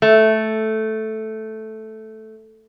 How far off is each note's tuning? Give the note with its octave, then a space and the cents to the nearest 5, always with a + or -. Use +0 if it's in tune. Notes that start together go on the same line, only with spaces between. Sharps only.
A3 -5